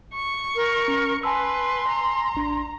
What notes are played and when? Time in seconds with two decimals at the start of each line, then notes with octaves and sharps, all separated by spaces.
0.14 C#6
0.56 A#4
0.88 C#4
1.23 B4 G#5 A5 C6 E6
1.89 A#5
2.35 A1 D4